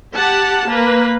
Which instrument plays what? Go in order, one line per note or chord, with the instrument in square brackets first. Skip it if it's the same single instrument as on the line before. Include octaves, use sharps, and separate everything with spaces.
[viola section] G4 F#5 A5
A#3 B4